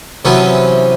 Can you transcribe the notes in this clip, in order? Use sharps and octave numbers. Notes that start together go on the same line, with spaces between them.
C3 E3 F#3 B3 C#4